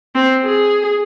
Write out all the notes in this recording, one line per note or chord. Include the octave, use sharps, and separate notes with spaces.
C4
G#4